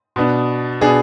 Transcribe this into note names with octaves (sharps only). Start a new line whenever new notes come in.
B2 B3 D4
B2 B3 D4 G#4